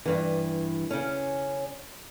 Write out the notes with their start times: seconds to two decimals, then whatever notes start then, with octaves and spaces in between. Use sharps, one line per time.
0.06 G2 E3
0.91 C#3 C#4